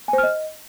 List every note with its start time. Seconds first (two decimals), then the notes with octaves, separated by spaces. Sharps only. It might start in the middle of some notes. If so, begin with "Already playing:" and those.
0.08 G#5
0.13 C5
0.18 F6
0.23 D#5